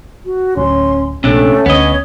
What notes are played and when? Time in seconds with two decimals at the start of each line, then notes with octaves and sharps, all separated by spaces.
0.25 F#4
0.57 D1 C#4 C6
1.24 A#1 C3 A3 C#4 D4
1.66 D2 B3 C#5 D#5